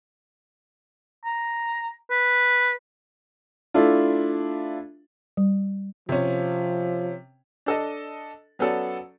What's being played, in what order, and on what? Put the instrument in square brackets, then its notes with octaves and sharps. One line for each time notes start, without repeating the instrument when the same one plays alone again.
[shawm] A#5
B4
[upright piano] A3 D4 E4 F4
[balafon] G3
[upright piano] C3 C#4 [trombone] F3
[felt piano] D4 A4 D#5
F#3 B3 C#4 A4 D5